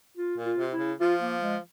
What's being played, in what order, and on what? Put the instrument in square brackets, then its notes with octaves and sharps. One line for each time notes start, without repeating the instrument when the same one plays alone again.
[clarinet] F4
[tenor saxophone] A#2
[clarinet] F4
[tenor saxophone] C3
[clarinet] E4
[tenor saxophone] C#3
[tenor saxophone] F3 [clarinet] F4
[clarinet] A#3
G#3